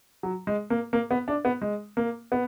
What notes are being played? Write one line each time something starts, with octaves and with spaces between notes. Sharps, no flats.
F#3
G#3
A#3
A#3
B3
D4
B3
G#3
A#3
B3